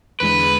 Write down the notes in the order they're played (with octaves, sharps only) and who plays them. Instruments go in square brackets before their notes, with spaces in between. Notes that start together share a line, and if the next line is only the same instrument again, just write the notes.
[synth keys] E2 D3 G#3 [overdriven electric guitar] B4